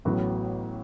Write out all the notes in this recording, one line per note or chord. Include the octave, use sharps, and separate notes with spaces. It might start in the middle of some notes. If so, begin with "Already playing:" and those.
A1 A2 F#3 B3 F#4